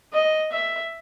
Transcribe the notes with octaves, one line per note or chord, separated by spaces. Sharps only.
D#5
E5